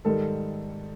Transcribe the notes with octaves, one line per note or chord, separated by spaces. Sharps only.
G#2 D#3 G3 A4